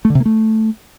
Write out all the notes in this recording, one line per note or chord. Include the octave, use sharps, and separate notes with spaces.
A3
D3
C3
A#3
A3